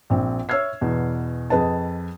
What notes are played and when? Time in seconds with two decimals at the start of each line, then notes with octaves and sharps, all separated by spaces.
0.10 A#1 C4
0.49 C#5 E5 E6 F6 G#6 C7
0.81 E2 B2
1.50 F2 G#4 B4 D#5 A5